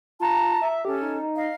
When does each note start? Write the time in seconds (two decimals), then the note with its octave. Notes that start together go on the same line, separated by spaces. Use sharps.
0.20 F4 A5 A#5
0.61 E5
0.85 C#4 G4 A4
1.02 D#4
1.22 D#4
1.36 D#5 F5